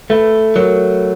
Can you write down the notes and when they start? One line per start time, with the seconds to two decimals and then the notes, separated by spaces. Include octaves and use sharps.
0.10 A3 B4
0.55 F#3 A#4